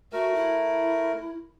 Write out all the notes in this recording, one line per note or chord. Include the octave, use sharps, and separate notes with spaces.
A3 F#4 A#4
E4